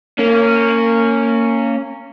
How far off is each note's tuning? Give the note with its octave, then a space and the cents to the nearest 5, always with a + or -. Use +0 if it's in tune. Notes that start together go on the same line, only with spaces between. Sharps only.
A#3 -25 C#4 +0